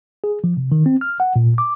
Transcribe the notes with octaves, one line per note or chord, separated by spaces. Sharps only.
G#4
F3
C3
D#3
C4
F6
F#5
A#2
D6